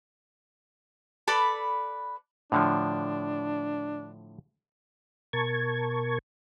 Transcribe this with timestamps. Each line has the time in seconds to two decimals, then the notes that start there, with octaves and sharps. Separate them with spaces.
1.27 A4 B4 D5 B5
2.52 A2 D3 F3 D4
5.33 B2 A#4 A5 C#6 G#6